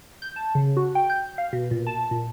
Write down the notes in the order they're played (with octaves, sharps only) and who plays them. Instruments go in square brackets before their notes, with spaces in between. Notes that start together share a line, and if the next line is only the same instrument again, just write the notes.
[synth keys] G6
A5
C#3
F#4
G5
G6
F5
B2
A#2
A5
A#2